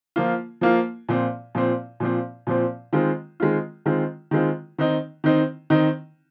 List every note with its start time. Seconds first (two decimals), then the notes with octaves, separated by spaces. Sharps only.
0.16 F3 A#3 F4
0.61 F3 A#3 F4
1.09 A#2 F3 C4
1.55 A#2 F3 C4
2.00 A#2 F3 C4
2.47 A#2 F3 C4
2.93 D#3 G#3 C4 F4
3.40 D#3 G#3 C4 F4
3.86 D#3 G#3 C4 F4
4.31 D#3 G#3 C4 F4
4.78 D#3 C4 D#4
5.24 D#3 C4 D#4
5.70 D#3 C4 D#4